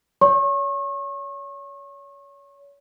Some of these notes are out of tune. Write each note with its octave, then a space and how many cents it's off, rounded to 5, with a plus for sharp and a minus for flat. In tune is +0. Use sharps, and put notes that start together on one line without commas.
C#5 +30 C#6 -35